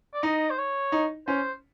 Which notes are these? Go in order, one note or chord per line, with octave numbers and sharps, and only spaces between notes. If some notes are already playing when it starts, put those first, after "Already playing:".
D5
D#4 D#5
C5
C#5
D#4
C#4 C5